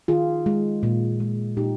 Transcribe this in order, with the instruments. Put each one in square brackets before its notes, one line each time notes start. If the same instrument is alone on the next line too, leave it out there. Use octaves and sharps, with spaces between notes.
[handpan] D#3 F4 G#4
G#3
A#2
G#3
A#2 D#4 G4